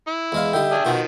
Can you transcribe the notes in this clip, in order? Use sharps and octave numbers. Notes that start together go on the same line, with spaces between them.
E4
E2 G#3 F5
D3 G3 D#4 E5 G5
D4 G#4
B2 D#3 F3 F#4